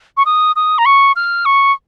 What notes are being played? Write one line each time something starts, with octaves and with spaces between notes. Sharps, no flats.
C#6
D#6
D#6
A#5
C#6
F6
C#6